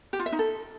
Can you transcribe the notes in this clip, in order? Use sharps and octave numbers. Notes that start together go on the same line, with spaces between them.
G4
F4
E5
D#4
A4